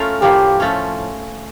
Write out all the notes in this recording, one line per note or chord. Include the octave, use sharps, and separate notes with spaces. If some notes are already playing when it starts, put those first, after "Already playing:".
Already playing: A3 C#4 F4 A#4
A2 F3 A#3 G4
F3 A3 C#4